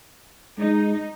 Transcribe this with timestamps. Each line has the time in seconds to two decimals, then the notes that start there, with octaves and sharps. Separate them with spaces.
0.59 G#3 D#4